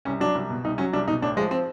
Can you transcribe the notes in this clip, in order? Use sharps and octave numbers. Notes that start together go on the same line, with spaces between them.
C2 C#4
F#3 D4
C2
B2
C2 D#4
F#3 C#4
C2 D4
B2 D#4
A1 D4
F3 G#3
C4